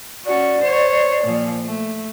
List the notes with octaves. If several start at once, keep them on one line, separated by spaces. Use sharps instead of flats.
C#4 F#4 D5
C5 C#5
A#2 F3
A3